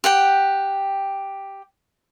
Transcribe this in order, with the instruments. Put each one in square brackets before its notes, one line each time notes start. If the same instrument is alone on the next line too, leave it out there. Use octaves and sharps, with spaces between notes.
[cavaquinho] G4 F#5 G5